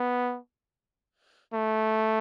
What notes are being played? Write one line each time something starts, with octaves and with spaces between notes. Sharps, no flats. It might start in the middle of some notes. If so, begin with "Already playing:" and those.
Already playing: B3
A3